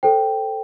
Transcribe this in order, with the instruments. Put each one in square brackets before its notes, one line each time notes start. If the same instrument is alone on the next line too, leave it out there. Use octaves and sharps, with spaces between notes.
[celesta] A4 C5 G5